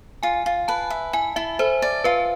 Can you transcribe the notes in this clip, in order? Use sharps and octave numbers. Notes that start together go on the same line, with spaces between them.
F4 G#5
F4
B4 A5
E5
E4 G#5
E4 E5
A4 C5
D5
F4 B4